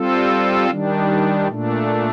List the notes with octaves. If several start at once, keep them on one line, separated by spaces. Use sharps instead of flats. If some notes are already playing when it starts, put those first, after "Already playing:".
Already playing: G3 C4 F4 A4
D#3 G3 D4
A#2 A3 D4